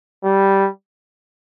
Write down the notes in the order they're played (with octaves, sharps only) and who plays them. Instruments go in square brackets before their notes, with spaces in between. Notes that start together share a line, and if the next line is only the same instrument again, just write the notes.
[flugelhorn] G3